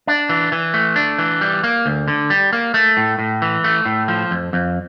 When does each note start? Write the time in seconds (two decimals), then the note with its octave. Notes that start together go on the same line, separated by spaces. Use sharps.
0.07 D4
0.29 E3
0.52 E3
0.74 A3
0.96 D4
1.18 E3
1.41 G3
1.64 A#3
1.86 D2
2.08 D3
2.30 G3
2.53 A#3
2.74 A3
2.97 A2
3.19 A2
3.42 E3
3.64 A3
3.86 A2
4.08 F3
4.31 F2
4.53 F2